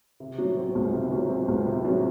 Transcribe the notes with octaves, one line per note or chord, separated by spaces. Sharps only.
C3
F#3
C4
C#2
C3
F#3
C4
C#2
C3
F#3